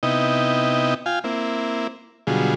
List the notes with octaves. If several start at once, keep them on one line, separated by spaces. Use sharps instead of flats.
C3 B3 D#4 E4 D#5 G5
F4 F5 G5 G#5
A#3 C4 E4
B2 D3 F#3 G3 F4 G#4